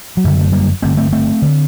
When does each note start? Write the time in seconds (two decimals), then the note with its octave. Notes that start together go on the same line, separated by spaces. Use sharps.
0.17 F#3
0.24 F#1 F#2 D3 G3
0.40 A3
0.53 G3 A#3
0.82 G1 G2 D3 A3 C4
0.97 A3 C4
1.12 A3 C4
1.42 D3